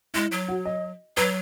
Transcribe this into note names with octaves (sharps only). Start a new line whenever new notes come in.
G#3 E4
F#3
F#4
D#5
F#3 B4